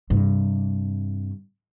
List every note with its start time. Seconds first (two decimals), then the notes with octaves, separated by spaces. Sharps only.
0.10 G2 C3